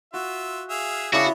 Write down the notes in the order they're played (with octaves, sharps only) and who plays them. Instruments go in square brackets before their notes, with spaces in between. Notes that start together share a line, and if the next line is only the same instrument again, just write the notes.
[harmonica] F4 E5 [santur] F#4
[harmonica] G#4 E5 F5
[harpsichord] C#3 D4 [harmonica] B3 [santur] E4 B5 [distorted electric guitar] F#4